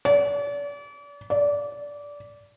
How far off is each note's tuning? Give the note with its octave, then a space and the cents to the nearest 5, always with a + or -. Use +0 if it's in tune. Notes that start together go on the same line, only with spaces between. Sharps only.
D5 -40
D5 -20